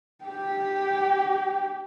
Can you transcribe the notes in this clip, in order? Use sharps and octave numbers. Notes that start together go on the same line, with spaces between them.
G4 G5